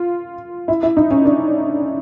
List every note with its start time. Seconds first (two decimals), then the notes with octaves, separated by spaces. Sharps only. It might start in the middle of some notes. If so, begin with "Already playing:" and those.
Already playing: F4
0.68 E4
0.83 E4
0.97 D#4
1.11 C#4
1.25 D4